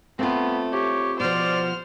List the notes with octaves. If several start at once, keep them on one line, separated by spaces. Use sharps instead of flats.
A3 B3 C4 F4
G4 C#5
B2 F3 C5 D5 F6